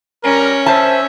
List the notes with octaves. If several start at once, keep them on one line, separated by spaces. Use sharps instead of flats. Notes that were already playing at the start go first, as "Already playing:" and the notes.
G3 C#4 A#4
C5 E5 A5